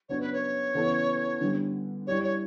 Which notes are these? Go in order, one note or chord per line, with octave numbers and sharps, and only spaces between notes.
C#3 F#3 B3 D4 C#5
B4
C#5
C#3 E3 B3 E4 A4
D3 G3 B3
G3 C#4 E4 G4 C#5 D5
C#5